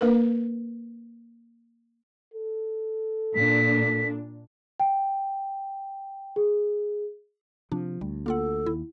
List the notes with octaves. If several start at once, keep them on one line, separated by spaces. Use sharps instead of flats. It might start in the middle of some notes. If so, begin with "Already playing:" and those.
A#3 D4 A#4 B4
A4
A#2 D4 B6
G5
G#4
C3 F3 D4
D2 G3
A#3 F4 A4 F#5
D#2 E4